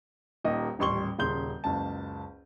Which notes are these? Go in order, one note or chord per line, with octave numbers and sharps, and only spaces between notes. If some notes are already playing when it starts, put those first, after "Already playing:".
D#1 D#2 D#5
D#1 A1 G3 C6 C#6 G7
D#1 C#3 C6 G6 G7
F#1 C#2 A5